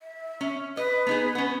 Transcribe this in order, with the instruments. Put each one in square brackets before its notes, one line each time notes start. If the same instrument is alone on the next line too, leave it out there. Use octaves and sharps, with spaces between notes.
[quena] E5
[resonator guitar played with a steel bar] C#4
[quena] B4 [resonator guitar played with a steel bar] D#5
[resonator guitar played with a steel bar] B3 D#4 G#4
B3 C#4